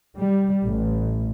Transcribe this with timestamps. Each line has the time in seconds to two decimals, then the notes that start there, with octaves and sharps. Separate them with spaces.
0.19 G3
0.67 A1